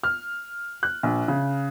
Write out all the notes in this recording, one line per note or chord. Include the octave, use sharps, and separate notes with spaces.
F6
F#6
A#1
C#3